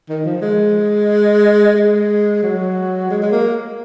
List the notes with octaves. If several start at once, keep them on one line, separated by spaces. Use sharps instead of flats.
D#3
F3
G#3
G#3
F#3
G#3
G#3
A#3